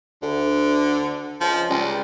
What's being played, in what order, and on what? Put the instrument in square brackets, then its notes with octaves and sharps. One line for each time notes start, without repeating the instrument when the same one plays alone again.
[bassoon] D2 [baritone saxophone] D3
[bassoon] C#2 [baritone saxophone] F3
[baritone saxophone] C#2 [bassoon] G3